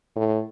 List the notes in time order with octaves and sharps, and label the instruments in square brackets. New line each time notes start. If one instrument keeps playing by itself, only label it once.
[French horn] A2